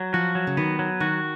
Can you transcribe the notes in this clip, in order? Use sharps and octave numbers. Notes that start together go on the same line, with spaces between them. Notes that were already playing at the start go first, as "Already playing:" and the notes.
Already playing: F#3
F3 F#4
F#3
C#3
D#3 B3
F#3
D#3 F#4